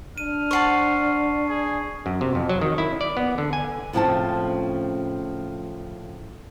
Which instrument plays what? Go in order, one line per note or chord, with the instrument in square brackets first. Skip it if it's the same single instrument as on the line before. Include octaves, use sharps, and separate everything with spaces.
[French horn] D4 [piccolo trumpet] F6 [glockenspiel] D#7
[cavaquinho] C5 F#5 A5 [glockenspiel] C#6 C7
[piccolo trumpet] G#4
[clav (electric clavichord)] F#2
C3
F2
F#3
D#3
E4
D5
B3
D3
G#5
[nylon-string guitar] A2 C#3 F3 C4 C#4 A5